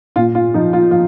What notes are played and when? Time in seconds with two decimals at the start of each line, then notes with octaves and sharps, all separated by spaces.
0.16 A#2 F4
0.35 F4
0.54 F3 D#4
0.73 F4
0.91 F3 F4